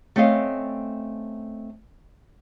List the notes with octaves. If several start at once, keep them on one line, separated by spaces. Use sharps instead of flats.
A3 C4 C#4 D#5 F5